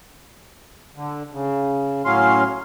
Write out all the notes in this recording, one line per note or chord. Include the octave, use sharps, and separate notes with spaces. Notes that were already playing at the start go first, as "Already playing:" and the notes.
D3
C#3
A2 F#3 C#4 F5 C6